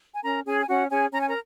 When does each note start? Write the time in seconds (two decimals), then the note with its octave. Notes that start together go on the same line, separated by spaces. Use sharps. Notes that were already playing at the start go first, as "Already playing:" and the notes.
0.12 G#5
0.23 C#4 A#4 A#5
0.45 C#4 G#4 G#5
0.60 G#5
0.68 C#4 F#4 F#5
0.90 C#4 G#4 G#5
1.12 C#4 A#5
1.21 G#5
1.29 A#4 A#5